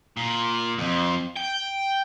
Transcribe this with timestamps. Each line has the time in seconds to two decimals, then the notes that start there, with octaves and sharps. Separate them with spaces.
0.17 A#2
0.78 F2
1.36 G5